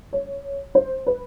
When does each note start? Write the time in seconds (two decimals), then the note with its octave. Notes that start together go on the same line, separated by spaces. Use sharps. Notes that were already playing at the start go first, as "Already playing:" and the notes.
0.13 C#5
0.75 C5
1.07 B4